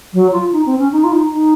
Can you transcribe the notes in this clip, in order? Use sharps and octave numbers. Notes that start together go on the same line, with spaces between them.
F#3
F4
D#4
C4
C#4
D#4
F4
D#4
D#4